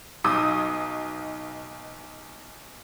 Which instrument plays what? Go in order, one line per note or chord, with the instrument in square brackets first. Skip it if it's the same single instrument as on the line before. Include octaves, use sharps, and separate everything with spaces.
[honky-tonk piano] B1 D#4 D#6